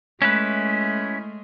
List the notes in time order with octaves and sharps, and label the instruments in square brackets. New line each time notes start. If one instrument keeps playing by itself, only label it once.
[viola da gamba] G#3 A3 [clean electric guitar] C#4 E4 B4